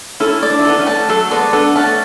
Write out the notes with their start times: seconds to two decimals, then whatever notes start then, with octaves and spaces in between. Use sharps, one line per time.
0.20 C#4 E4 A4
0.43 D5
0.50 D4
0.59 E4
0.65 B3 D4 A4
0.79 A3 C#4
0.87 A5
1.08 F#3 A3 A4
1.31 G#3 B3 D5
1.53 B3 D4 A4
1.76 A3 C#4 A5